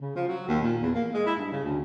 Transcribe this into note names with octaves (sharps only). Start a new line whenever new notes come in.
C#3
F3
F#3
D#2
A#2
E2
A#3
G#3
E4
G2
C#3
D2